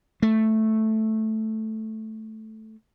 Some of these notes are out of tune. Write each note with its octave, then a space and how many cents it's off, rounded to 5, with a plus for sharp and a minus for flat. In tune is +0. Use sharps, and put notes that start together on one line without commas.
A3 -5